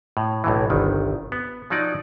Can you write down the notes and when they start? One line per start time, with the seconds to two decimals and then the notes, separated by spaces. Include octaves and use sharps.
0.17 A2
0.44 B1 A2 E3
0.70 G1 C2 D#3
1.32 B3
1.70 F3 F#3 D#4 D5